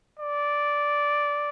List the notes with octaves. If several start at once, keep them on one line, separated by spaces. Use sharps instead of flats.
D5